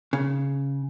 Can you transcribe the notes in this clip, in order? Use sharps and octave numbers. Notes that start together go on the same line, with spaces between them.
C#3